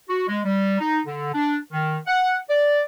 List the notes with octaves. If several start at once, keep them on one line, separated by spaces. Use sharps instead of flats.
F#4
G#3
G3
D#4
D3
D4
D#3
F#5
D5